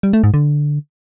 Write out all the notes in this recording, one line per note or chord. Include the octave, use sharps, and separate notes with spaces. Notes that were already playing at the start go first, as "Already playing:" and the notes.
G3
A3
G#2
D3